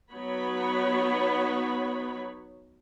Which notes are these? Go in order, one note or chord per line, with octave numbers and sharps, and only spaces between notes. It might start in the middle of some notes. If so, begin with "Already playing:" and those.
F#3 B3 D#4 C#5 B5